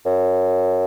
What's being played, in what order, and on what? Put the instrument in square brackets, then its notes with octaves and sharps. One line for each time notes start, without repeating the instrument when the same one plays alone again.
[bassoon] F#2